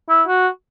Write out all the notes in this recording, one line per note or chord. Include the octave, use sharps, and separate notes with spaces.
E4
F#4